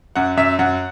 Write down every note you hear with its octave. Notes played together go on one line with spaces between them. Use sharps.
F#2 F#5
F#2 E5
F#2 F#5